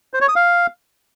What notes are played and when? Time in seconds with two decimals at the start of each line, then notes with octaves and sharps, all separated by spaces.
0.14 C5
0.21 C#5
0.28 D#6
0.36 F5